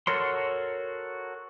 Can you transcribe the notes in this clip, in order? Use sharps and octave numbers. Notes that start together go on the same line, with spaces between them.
F#4 A4 A#4 C#5 C6